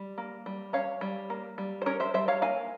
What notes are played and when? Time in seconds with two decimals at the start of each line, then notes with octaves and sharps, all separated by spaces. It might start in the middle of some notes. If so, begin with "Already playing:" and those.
Already playing: G3
0.18 A#3
0.46 G3
0.73 C#4 C#5 F5
1.01 G3
1.30 A#3
1.58 G3
1.82 C5
1.86 C#4 A#4 C#5
2.00 C5 E5
2.14 G3 C5 E5
2.28 C#5 F5
2.42 A#3 F5 G#5